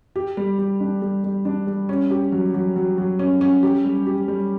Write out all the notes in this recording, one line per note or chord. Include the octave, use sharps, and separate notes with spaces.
G4
G3
G3
D4
G3
G3
D4
G3
C#4
G4
F#3
F#3
F#3
F#3
C#4
C#4
G4
G3
G4
G3